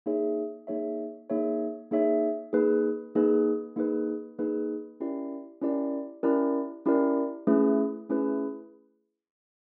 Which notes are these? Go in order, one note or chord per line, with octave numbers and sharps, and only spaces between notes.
A#3 D#4 G#4 C#5 E5
A#3 D#4 G#4 C#5 E5
A#3 D#4 G#4 C#5 E5
A#3 D#4 G#4 C#5 E5
A#3 D#4 G#4 B4
A#3 D#4 G#4 B4
A#3 D#4 G#4 B4
A#3 D#4 G#4 B4
C#4 E4 G4 A#4 D5
C#4 E4 G4 A#4 D5
C#4 E4 G4 A#4 D5
C#4 E4 G4 A#4 D5
A3 C#4 E4 G#4 B4
A3 C#4 E4 G#4 B4